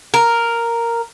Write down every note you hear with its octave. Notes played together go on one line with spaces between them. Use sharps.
A#4